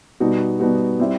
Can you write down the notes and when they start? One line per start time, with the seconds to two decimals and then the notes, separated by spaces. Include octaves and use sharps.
0.20 B2 G3 B3 D#4 F#4
0.60 B2 G3 B3 D#4 F#4
0.99 G3 C4 E4